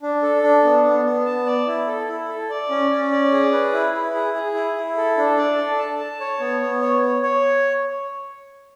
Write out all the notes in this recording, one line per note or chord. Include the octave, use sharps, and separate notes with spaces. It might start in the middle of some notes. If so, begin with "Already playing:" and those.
D4
A4
D4
B3
B3
B3
A5
D5
E4
A4
E4
A4
D5
C#4
C#4
D5
G#4
B4
E4
E4
G#4
G#4
E4
E4
A4
D4
D5
A4
A5
A5
C#5
B3
B3
C#5
C#5
C#5